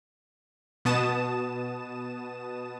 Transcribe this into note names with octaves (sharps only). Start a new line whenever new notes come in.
B2 B3 A5 D#6 E7